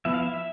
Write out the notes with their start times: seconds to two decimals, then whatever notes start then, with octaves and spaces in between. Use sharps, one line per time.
0.05 F3 B3 E4 E5
0.14 F5
0.23 E5
0.34 E5